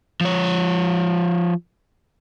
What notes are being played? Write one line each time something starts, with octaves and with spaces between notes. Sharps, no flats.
F3 C#5